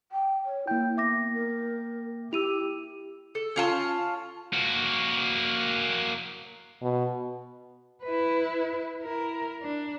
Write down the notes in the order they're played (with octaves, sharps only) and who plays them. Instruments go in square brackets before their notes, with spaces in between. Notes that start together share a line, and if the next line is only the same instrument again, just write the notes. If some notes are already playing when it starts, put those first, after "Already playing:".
[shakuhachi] G5
C#5
[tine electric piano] A#3 G5 [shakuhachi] E4 [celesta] G6
[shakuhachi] B3 [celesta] E5 D6 A#6
[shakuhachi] A#4
[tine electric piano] E4 [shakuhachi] G4 [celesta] E6 D#7 F7
[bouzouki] A4
C#4 F4 A5
[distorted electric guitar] A#3 F#4
[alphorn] B2
[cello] E4 B4
E4 A#4
D4